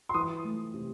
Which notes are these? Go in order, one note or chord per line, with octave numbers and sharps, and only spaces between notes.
C6
E3 D#6
A3
C3